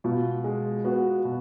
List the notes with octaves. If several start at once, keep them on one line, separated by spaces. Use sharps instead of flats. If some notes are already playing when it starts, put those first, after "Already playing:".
B2 F4
G#3
B3 F#4
B2